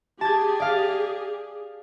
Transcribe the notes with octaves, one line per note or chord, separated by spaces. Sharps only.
G4 G#4 A5 G#6
D5 F5